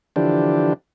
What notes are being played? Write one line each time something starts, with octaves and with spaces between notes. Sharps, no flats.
D3 E3 F3 D4 G4